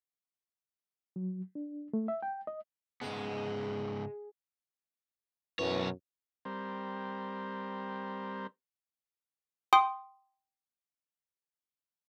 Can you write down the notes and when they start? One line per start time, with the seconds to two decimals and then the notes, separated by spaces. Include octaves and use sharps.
1.16 F#3
1.55 D4
1.93 A3
2.08 E5
2.23 G5
2.47 D#5
3.01 G#2 C#3 G#3 B3
5.59 B1 F#2 E3 C#5
6.45 G3 C4 A#4 C5
9.73 G5 C6 D#6